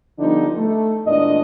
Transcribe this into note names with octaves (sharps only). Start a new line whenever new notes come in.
D3 F3 G3 B3 D4 D#4
A3
E2 A#2 G#3 D4 D#5